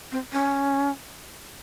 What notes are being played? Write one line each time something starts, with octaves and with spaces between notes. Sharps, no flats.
C4
C#4